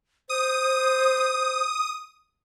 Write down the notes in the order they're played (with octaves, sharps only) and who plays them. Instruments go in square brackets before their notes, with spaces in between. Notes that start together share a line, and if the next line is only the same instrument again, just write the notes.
[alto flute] C5 [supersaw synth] D#6